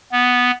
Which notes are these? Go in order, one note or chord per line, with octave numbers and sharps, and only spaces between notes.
B3